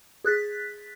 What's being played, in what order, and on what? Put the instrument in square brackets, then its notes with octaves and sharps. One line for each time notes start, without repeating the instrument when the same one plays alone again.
[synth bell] G#4 F#6 A6 B6